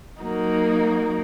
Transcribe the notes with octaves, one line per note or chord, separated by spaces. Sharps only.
F#3 A#3 D#4 F#4 A#4